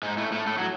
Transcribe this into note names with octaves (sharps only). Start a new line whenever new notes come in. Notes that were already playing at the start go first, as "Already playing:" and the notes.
G#2 G#3
A2 A3
A2 A3
A2 A3
F#3